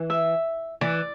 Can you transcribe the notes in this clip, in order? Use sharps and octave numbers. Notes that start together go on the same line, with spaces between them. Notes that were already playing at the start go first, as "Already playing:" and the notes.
Already playing: E3
E5
E3 D5